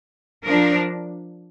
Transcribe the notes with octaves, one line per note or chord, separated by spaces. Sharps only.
F3 D4 A#4